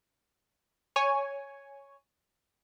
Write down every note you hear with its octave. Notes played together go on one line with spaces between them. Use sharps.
C#5 G#5